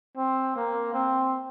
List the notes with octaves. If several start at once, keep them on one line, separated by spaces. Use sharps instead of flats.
C4
A#3
C4